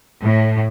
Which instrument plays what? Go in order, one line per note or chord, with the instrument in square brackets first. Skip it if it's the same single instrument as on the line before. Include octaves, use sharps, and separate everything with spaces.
[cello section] A2